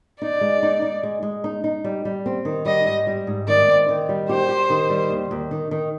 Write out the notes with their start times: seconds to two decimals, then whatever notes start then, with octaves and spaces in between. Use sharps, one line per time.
0.21 D#4 D5
0.41 G#3
0.63 D#4
0.82 D#4
1.03 G#3
1.23 G#3
1.44 D#4
1.64 D#4
1.84 G3
2.05 G3
2.26 C4
2.45 D#3
2.65 G3 D#5
2.86 G#2
3.07 G3
3.27 G#2
3.48 D#3 D5
3.68 C4
3.89 D#3
4.09 G3
4.29 G4 C5
4.49 G4
4.70 D#3
4.90 G3
5.10 D#2
5.31 D#2
5.51 D#3
5.71 D#3